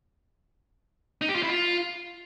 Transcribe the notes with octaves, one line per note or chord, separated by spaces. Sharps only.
D#4
G4
F4
E4
F4